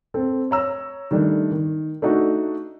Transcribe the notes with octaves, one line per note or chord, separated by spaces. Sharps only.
C4 A4
C#5 A#5 E6
D#3 G3 A3 D4
D#3
A3 D4 D#4 F#4